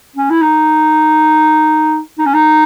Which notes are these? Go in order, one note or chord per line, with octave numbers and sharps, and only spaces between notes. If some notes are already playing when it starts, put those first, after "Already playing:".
C#4
E4
D#4
D#4
C#4
D#4